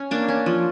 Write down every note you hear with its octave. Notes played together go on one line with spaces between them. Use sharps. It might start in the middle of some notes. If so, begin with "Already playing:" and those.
Already playing: C#4
A#3 D4
C#4
F3